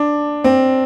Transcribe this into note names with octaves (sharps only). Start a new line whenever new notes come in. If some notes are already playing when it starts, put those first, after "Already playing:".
Already playing: D4
C4